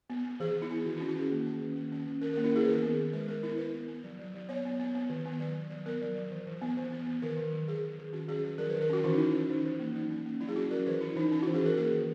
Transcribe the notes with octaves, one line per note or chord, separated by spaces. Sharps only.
B3
B3
E3 G#4
B3
E4
B3
D#3 F#4
E4
C#4
F#4
D#3 G#4
A#3
C#4
D#3
A#3
C#4
D#3
C#4 A#4
A#4
A#3
E4
A#3 G#4
B4
D#3 A#4
B3
B3
G#3 B4
G#3 A#4
B3 E4
B3 B4
B3
B3
F#3
F#3
F#3
B3 C#5
B3
B3
B3
D#3
B3
F#3 B4
F#3
F#3
B3 A#4
F#3
F#3
E3
E3
B3
E3
B3
B3
D#3 A#4
D#3
F#3
D#3 G#4
D#3
D#3
C#4 F#4
F#3 G#4
D#3 G#4
F#3 A#4
B4
D#3
A#4
C#4 F#4
E3 E4
D#4
E3 E4
C#4
E3 D#4
E3
A#3
F#3 D#4
C#4
A#3
F#3 E4
G#4
C#4 F#4
F#3 A#4
E3 B4
E3 E4
E3 D#4
C#4 E4
F#4
E3
G#4
E3 A#4
A#3 G#4
D#3